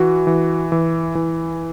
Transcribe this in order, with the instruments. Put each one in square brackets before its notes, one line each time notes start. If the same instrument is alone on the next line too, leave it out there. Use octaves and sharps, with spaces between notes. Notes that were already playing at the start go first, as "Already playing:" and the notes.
Already playing: [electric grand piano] E3 [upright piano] F#4
[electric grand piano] E3
E3
E3